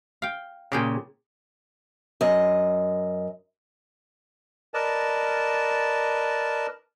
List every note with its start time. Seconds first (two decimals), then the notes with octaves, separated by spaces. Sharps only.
0.22 F5 G5
0.72 A#2 C#3 G4 G#4 G5
2.21 F#2 D#5
4.74 A#4 B4 D5 D#5 A5